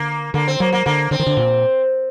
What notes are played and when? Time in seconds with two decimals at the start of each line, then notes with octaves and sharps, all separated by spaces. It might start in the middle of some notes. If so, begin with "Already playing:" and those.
Already playing: D3 A#3
0.34 D3 A#3
0.48 C4
0.60 F#3 A#3
0.72 A#3
0.86 D3 A#3
1.11 D3 C4
1.19 D#3
1.27 D3
1.37 A#2